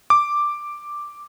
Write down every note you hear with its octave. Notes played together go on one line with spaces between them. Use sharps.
D6